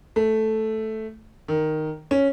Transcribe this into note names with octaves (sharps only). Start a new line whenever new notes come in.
A3
D#3
C#4